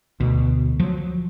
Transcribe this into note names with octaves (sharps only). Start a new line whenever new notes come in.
D2 B2
F3 F#3